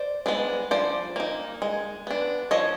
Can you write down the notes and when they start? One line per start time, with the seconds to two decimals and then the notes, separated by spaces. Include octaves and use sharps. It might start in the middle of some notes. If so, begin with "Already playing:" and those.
Already playing: C5 D5
0.26 G#3 B3 D4
0.71 F3 C5 D5
1.16 A#3 D#4
1.62 G#3
2.07 B3 D4
2.51 F3 C#5 D#5